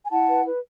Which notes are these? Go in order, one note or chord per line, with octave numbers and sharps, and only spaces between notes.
G#5
E4 F#5 A5
B4
B4